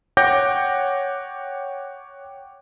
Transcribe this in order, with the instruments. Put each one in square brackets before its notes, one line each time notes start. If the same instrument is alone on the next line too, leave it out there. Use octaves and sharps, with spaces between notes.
[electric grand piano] C#5 F#5 G5 D6 G6 A#6